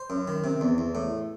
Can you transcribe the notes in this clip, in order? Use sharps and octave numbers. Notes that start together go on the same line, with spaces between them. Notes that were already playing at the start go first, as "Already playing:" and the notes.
Already playing: C5
F#2
D#3
C3
E2
E2
A2